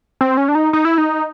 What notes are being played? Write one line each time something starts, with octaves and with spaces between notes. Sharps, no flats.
C4
C#4
D4
D#4
D#4
E4
D#4